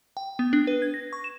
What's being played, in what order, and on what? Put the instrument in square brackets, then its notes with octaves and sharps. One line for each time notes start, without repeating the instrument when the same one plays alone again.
[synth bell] G5
B3
D4
B4
G#6
A#6
C#6
E7